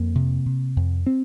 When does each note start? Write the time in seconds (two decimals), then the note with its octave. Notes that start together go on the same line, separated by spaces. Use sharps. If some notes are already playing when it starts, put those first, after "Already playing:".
Already playing: F2 A#3
0.15 C3
0.46 C3
0.76 F2
1.06 C4